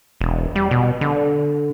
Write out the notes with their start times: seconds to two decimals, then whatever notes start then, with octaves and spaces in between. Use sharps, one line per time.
0.21 E1
0.56 G3
0.71 B2
1.01 D3